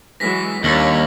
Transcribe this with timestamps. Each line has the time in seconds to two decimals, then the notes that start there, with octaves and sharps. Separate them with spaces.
0.20 E3 F#3 G#3 A#6 B6
0.64 D#2 G3 D4 C#5 E6 A#6 F#7